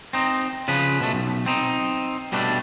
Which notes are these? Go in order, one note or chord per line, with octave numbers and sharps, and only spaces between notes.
C4 D#4
C#3 F3 B4
B2 A3
B1
C4 D#4
B2 G3 A3 D4